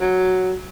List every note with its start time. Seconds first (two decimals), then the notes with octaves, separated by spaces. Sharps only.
0.01 F#3